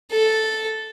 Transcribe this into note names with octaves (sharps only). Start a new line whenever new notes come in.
A4